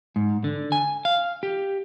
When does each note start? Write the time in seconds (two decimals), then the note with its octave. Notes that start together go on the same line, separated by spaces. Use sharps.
0.16 G#2
0.44 D3
0.72 G#5
1.05 F5
1.43 G4